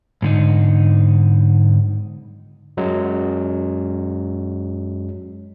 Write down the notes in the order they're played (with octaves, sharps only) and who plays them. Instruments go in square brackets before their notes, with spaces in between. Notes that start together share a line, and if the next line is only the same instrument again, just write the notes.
[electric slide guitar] G#2 D3 D#4
[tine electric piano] F#2 F#3 G#3